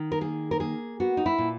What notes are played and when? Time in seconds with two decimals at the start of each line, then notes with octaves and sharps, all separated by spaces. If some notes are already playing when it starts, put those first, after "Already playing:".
Already playing: D#3
0.12 A#4
0.21 A#3 G#4
0.51 A#4
0.60 A#3 G#4
1.00 B3 F#4
1.17 D#4
1.26 E4
1.38 A#2